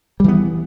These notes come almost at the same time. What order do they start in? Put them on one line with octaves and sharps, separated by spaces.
G3 E3 B3